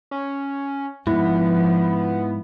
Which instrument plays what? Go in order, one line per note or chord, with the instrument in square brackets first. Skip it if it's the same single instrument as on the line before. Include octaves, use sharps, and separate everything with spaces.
[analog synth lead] C#4
[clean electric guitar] G#2 [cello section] F3 [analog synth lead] B3 [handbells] E4